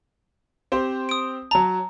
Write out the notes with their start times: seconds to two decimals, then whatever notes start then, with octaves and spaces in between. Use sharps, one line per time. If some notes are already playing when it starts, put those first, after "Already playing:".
0.72 C4 G4 C5
1.09 D#6 D7
1.51 F#3 A5 A#5